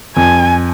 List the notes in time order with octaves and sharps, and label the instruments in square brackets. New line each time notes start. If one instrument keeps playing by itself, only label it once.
[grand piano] F2 [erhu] G#5